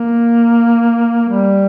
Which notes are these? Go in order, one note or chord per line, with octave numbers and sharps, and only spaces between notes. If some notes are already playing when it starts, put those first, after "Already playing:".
Already playing: A#3
G3